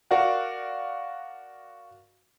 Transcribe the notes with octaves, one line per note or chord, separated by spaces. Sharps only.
F#4 A#4 D5 F5 F#5